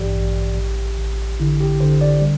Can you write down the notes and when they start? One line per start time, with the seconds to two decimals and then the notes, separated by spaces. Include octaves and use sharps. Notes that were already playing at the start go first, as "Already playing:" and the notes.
Already playing: A1 G2 E3 G4 D5
0.16 A1
0.58 A1
0.98 A1
1.40 D3 E4
1.61 G4
1.80 D3 C5
2.01 D5
2.21 G3